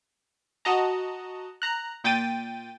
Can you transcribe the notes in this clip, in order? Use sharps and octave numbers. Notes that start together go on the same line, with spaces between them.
F#4 D#5 A5 A#5
A#5 F#6
A#2 G5 A6 D#7